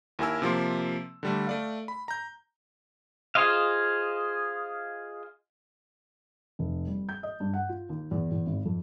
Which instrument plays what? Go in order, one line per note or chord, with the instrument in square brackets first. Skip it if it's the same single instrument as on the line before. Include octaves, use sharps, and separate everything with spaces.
[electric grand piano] D#2 E4 A#4 G#5 E6
C3 F3 A#3 C6
D3 G3 A3
A3 D5 F5
B5
A#5 G6
[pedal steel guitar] F4 G#4 C5 D#5 F5
[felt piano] F1
G3
G6
D#5
G2
F#5
F4
D#2
E2
E2
G#1
F2